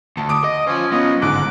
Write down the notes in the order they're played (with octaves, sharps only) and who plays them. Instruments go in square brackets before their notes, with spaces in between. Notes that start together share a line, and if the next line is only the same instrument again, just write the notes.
[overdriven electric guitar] D2 [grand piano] A5
[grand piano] D6 D#6 D7
[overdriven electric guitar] D#5
[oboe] C#4 [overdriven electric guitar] F4 C5
[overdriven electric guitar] F#3 B3 [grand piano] C#4 F4 [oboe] D#5
[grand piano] G1 D#3 F#6 [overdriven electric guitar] G#2 [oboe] D6